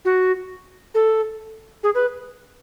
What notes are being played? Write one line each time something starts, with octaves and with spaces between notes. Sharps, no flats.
F#4
A4
G#4
B4